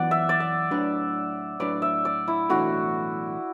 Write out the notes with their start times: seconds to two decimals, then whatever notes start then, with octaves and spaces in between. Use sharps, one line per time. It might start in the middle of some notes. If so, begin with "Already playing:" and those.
Already playing: F#2 E3 B3 F#4 D5 F#5
0.11 E5
0.29 D5
0.40 E5
0.71 A2 F#3 D4 B4
1.60 A2 F#3 D4 B4 D5
1.82 E5
2.05 D5
2.28 E4
2.50 B1 A2 E3 A3 D4 F#4